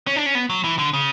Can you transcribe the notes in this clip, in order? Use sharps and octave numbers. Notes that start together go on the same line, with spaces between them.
C#4
D4
C#4
B3
F#3
E3
D3
C#3